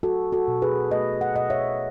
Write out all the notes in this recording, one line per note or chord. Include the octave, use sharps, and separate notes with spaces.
F#3 F#4 A4
F#4 A4
B2
G#4 B4
A3 B4 D#5
F#5
B2 D#5 F#5
C#5 E5